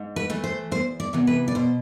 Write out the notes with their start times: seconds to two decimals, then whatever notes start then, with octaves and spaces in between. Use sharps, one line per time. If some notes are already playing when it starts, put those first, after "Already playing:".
Already playing: G#2
0.16 B4
0.30 E3 A3
0.44 C5
0.71 E2 C5
1.00 D5
1.13 C3 E3 B3
1.27 B4
1.48 D5
1.55 B2 C5